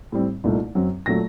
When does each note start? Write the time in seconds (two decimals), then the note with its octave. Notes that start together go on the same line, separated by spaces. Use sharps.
0.12 A2 G3 C4
0.44 C2 A#2 A3 D#4
0.75 F#2 F#3 C4
1.06 A#2 F#3 A3 A#6